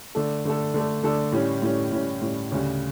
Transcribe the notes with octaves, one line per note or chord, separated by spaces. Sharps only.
D3 A3 D4 A4
D3 A3 D4 A4
D3 A3 D4 A4
D3 A3 D4 A4
A2 G3 C#4
A2 G3 C#4
A2 G3 C#4
A2 G3 C#4
D2 C#3 G3 C#4